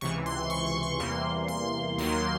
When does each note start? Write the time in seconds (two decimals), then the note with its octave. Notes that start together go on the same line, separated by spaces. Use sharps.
0.01 C#2 C3 E3 C#6
0.26 C6
0.50 C#6
0.67 C6
0.83 C#6
1.00 E2 C3 E3 G3 A#3 C6
1.48 C6
1.98 D#2 D#3 F#3 A#3 C6